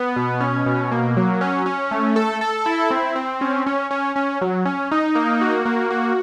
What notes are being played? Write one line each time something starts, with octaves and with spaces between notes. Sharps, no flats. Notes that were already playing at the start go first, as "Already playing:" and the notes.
Already playing: B3
B2
C#4
B2
A#3
F#3
C#4
C#4
A3
A4
A4
E4
C4
C4
C#4
C#4
C#4
C#4
F#3
C#4
D#4
A#3
F#4
A#3
F#4